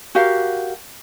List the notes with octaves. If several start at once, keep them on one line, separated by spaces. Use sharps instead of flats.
F#4 G4 A#4 F5